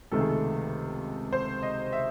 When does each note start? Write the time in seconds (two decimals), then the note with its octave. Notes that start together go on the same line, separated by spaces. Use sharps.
0.11 C#2 C3 D#3 A3 A4
0.20 G#4
0.29 A4
1.33 C5
1.63 D#5
1.93 E5